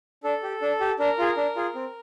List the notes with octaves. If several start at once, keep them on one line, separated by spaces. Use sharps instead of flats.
D4 A4
G4
D4
G4
D4 A#4
F4 G#4
D4
F4 G#4
C4